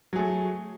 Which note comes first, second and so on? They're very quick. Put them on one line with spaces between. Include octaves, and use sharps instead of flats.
F#3 G#4 A3